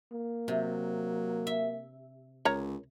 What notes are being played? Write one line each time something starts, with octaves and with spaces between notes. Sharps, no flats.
A#3
C3 F#3
E5
C#2 A#4 C#5 A#5